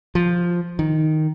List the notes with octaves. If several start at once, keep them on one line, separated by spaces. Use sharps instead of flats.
F3
D#3